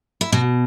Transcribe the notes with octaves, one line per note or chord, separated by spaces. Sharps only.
E4
B2 F#4